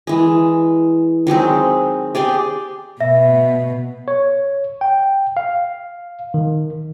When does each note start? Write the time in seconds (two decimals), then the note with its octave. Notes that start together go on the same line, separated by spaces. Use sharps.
0.07 E3 G#3
1.27 D#3 F#3 G#3 C4
2.15 G4 G#4 D5 C6
3.01 B2 E5
4.08 C#5
4.81 G5
5.37 F5
6.34 D#3